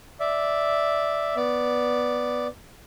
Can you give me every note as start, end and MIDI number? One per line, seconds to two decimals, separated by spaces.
0.20 1.36 74
0.20 1.36 76
1.36 2.47 59
1.36 2.47 74